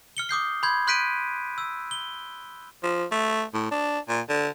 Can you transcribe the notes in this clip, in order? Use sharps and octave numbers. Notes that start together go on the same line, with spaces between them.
F6 C#7 G7
D6 D#6 G6 C7
B5 C6 G6 G#6
C6 F#6 G6 B6 D7 D#7
E6
G7
F3
A3
A2
D4
A#2
D3